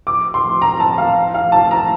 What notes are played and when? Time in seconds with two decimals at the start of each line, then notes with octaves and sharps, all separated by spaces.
0.07 D6
0.34 C6
0.62 A#5
0.80 A5
0.98 F5
1.34 F5
1.52 A5
1.71 A#5